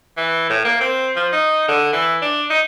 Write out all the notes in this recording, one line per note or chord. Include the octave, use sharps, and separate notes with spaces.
E3
A2
A#3
C4
F3
D#4
D3
E3
D4
D#4